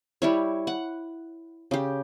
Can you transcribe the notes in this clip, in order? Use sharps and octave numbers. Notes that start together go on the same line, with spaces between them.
G3 E4 C#5
F#5
C#3 G4